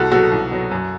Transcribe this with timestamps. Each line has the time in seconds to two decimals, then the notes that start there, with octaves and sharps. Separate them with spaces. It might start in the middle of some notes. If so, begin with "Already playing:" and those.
Already playing: C2 F#4 A4
0.11 B2 F#3 F#4 A4
0.32 C2
0.51 B2 F#3
0.71 F#2